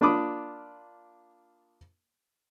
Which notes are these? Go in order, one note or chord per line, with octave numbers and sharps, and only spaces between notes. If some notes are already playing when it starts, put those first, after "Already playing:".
A#3 D4 F4 B5 D6 D#6